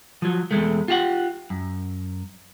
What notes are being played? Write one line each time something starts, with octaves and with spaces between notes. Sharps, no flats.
F3 F#3
E2 A#2 G#3 A3
F4 G4 F#5
F#2